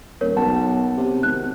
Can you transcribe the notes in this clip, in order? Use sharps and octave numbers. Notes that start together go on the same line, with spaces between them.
D#1 A#4 C#5
B1 B3 F#5 A5
C3
G#1 F#6